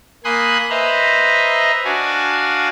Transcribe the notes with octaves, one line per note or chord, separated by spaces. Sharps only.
A#3 G#5 B5 C6 D#6 F#6
B4 C5 D#5 E5 A#5
D4 F#4 F5 G#5